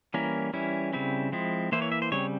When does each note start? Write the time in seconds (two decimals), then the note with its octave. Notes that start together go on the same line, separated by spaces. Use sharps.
0.14 E3 G3 A#3 C#4 E4 A#4
0.53 E3 G3 C#4 E4
0.93 C#3 G3 C4 E4
1.32 F3 G#3 C4 E4
1.72 E3 A#3 E4 C5
1.82 C#5
1.92 E5
2.02 C5
2.12 C#3 G3 C4 C#5